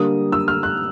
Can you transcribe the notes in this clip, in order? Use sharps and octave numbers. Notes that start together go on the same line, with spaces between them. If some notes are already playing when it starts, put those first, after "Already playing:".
Already playing: D3 G3 A#3 D#6
E6
F6
F#6